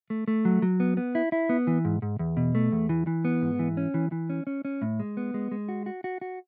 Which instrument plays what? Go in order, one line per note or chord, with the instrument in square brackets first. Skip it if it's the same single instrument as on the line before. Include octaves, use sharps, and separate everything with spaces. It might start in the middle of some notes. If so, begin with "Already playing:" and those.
[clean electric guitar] A3
A3
F#3
F#3
B3
B3
E4
E4
B3
E3
G#2
G#2
E2
B2
A3
E2
E3
E3
B3
G#2
E3
C#4
E3
E3
C#4
C#4
C#4
A2
G#3
B3
G#3
G#3
F#4
F#4
F#4
F#4